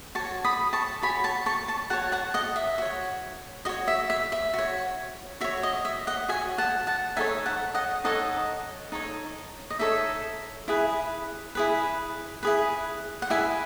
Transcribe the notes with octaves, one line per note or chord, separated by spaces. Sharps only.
F#4 C#5 A5 C#6
B5 D#6
A5 C#6
F#4 C#5 G#5 B5
A5 C#6
A5 C#6
A5 C#6
F#4 C#5 F#5 A5
F#5 A5
D#5 F#5
E5
F#4 C#5
F#4 C#5 D#5
E5
E5
E5
F#4 C#5
F#4 C#5 E5
D#5
E5
D#5 F#5
F#4 C#5 E5 G#5
F#5 A5
F#5 A5
D#4 A4 C#5 E5 G#5
F#5 A5
D#5 F#5
D#4 A4 C#5 D#5 F#5
D#4 A4 C#5
D#5
D#4 A4 C#5 E5
E4 G#4 B4
E4 G#4 B4
E4 G#4 B4
F#5
E4 G#4 B4 E5 G#5